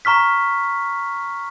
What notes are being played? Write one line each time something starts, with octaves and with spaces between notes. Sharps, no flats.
A#5 C#6 F6 B6